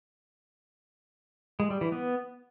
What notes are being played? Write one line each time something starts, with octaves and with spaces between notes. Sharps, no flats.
G#3
G3
E3
B3